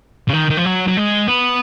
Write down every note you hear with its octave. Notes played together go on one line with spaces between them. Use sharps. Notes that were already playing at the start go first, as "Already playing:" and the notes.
C#3
D#3
D#3
F3
F#3
F#3
G#3
B3